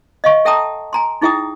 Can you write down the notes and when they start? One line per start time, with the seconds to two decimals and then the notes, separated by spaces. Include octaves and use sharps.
0.24 D#5 F5 C#6
0.45 A4 E5 G5 A5 A#5 D#6
0.93 G#5 A#5 C6
1.21 D#4 E4 G#4 E5 G5 D#6